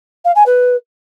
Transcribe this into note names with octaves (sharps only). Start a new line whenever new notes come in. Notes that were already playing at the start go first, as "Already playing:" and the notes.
F5
G#5
B4